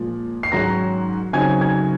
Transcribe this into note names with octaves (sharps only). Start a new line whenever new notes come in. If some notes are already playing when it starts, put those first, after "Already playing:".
Already playing: A#2 F3 G#3
C7
G#2 D#3 F#3 C#4 F#4 A#5 A#6
C#3 F#3 C4 D#4 G#5 G#6
G#5 G#6